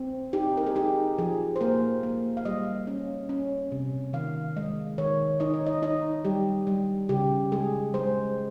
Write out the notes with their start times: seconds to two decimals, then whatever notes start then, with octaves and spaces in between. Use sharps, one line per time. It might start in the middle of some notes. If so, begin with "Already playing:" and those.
Already playing: C4
0.33 D#4 G4
0.57 A#4
0.66 G#4
0.76 D#4 G4
1.18 F3 G#4
1.56 C5
1.61 A#3 A#4
2.03 A#3
2.37 F5
2.45 G3 D#5
2.87 C#4
3.29 C#4
3.72 C3
4.13 D#3 F5
4.56 G#3 D#5
4.98 D#3 C#5
5.40 D#4 D#5
5.54 C#5
5.67 D#5
5.82 D#4 D#5
6.25 G3 G4
6.67 G3
7.09 C#3 G4
7.52 G#3 G#4
7.94 G#3 C5